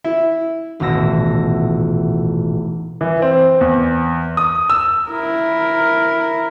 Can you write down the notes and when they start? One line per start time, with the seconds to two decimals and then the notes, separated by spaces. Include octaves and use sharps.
0.04 E4
0.80 D#1 A1 B2 E6 A#6
3.01 E3
3.22 C4
3.61 E2
4.37 D#6
4.70 E6
5.10 E4 A#4